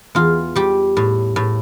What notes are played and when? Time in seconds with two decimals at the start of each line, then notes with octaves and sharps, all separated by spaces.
0.15 E2 F4
0.56 G3 G4
0.97 A2
1.36 A2